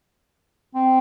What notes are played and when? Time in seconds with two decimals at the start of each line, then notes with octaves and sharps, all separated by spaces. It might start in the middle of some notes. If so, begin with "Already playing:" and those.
0.75 C4